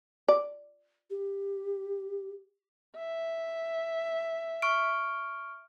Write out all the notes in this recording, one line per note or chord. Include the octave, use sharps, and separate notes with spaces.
D5
G4
E5
C#6 F6 D7